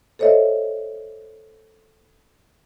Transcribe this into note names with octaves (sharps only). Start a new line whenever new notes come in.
A4 C5 C#5 D#5 E5